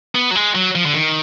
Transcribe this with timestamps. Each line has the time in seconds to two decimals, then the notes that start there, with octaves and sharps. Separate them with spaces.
0.15 B3
0.31 F#3
0.35 G#3
0.55 F#3
0.75 F3
0.86 D3
0.95 D#3